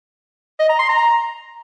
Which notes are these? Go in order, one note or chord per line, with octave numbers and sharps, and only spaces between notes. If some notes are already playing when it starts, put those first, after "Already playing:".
D#5
A#5
C6
A#5